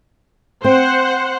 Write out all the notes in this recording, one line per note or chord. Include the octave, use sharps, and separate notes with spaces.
C4 C5 F#5